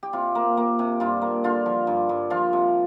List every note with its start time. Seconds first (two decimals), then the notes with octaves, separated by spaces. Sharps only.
0.03 G4
0.13 C3 F4
0.35 A#3
0.57 A#3
0.79 C3
1.00 G2 F4
1.22 A#3
1.44 D3 F4
1.66 F3
1.87 G2
2.09 G2
2.30 F3 F4
2.53 C3